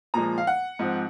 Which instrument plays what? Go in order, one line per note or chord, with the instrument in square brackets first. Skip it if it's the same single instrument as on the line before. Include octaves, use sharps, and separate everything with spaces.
[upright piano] A#2 F3 G#3 A#5
F5
F#5
G#2 F3 C4